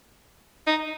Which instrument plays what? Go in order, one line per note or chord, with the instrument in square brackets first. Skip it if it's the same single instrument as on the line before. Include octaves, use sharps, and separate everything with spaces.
[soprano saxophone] D#4